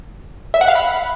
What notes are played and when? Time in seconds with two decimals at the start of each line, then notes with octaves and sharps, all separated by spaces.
0.54 E5
0.61 F#5
0.68 F5
0.75 B5